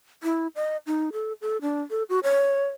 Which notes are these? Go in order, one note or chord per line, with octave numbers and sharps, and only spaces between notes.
E4
D#5
D#4
A4
A4
D4
A4
F#4
C#5